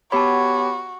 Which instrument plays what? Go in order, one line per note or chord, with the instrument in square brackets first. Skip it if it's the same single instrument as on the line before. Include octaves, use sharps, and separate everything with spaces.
[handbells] B3 G4 C#5 [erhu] F#4 [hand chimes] A5 B5